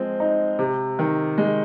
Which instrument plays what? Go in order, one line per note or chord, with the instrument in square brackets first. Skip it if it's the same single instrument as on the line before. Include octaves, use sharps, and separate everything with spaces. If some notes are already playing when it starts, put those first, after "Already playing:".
Already playing: [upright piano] F3 G#3 C4
D#4
C3
D#3
G#3